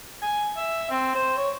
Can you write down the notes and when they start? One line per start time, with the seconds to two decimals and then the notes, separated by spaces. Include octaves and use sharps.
0.22 G#5
0.57 E5
0.90 C4
1.15 C5
1.37 C#5